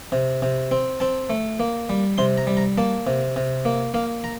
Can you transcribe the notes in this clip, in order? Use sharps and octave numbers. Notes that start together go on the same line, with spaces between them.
C3
C3
C4
C4 A5
A3
A#3
G3
C3 C6
A#5
G3
A#5
A#3 A5
C3
C3
A#3
A#3 F5
A#5